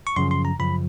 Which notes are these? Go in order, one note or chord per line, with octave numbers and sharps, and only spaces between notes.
C#6
F#2 C#3 F3 C6
C6
A#5
F#2 C#3 F3 B5